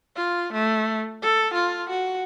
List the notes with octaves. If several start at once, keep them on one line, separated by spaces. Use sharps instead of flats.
F4
A3
A4
F4
F#4